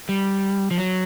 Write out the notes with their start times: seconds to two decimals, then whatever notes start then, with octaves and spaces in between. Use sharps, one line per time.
0.09 G3
0.71 F3
0.78 F#3